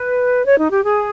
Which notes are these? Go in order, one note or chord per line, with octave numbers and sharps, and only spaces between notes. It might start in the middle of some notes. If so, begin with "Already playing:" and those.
Already playing: B4
C#5
D#4
G4
G#4